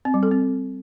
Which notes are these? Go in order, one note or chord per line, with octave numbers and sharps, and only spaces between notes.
C4
G3
A4
C4